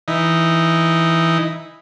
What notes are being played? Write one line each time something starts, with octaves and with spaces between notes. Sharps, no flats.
E3 D#4